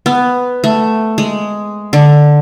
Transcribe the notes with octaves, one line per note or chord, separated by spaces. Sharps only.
B3
A3
G#3
D3